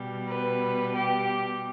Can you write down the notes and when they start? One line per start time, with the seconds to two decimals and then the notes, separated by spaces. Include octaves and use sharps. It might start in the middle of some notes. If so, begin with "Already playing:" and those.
Already playing: B2 G3
0.29 B4
0.96 G4